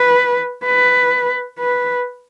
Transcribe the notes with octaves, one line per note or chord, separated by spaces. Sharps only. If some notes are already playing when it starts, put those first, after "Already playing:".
Already playing: B4
B4
B4